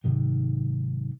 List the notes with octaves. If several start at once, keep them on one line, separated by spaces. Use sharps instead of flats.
G#2 C3 D#3 F#3